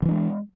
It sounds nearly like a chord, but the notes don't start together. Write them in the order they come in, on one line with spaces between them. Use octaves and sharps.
D#3 E3 D4 G#3